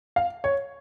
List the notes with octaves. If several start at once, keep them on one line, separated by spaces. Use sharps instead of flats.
F5
C#5